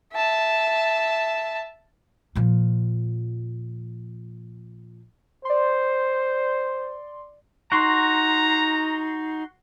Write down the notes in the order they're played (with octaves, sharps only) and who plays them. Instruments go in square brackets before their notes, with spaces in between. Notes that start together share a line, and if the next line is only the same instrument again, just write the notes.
[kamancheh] E5 A5
[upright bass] A#2 F3
[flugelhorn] C5 [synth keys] D5 C6
[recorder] D#4 [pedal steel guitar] F#4 C6 [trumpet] A#5